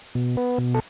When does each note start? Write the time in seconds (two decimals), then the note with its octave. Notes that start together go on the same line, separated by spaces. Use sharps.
0.15 B2
0.37 B3
0.58 B2
0.75 A4